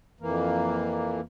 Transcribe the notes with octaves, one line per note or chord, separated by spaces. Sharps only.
F2 E3 A#3